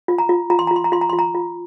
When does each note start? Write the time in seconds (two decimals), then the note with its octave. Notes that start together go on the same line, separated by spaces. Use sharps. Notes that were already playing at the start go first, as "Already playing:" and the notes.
0.08 F4
0.18 A#5
0.29 F4
0.50 F4 A#5
0.59 C6
0.67 A#5
0.71 F4
0.76 C6
0.84 A#5
0.92 F4 C6
1.01 A#5
1.09 F4 C6
1.19 A#5
1.35 F4